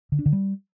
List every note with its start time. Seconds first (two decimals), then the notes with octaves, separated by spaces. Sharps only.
0.12 D3
0.19 D4
0.26 D3
0.33 G3